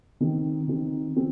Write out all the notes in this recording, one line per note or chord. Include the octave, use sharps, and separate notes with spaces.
D#3 C4 D#4
D#3 C4 D#4
F3 C4